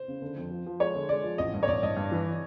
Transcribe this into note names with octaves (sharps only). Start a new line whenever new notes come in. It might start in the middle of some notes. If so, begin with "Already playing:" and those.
Already playing: C5
C#3
D3
F2
F3
F3
G#3 C#5
D3
G#3 D5
F3
A1 D#5
G2
C#5
A1 D5
G2 D#5
G2
E3